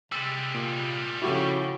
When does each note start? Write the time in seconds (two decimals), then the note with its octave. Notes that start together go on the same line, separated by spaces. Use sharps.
0.12 C3 G3 G#3 E6 A6 D#7
0.54 A#2
1.22 C#3 F3 E4 F#4 G4 A4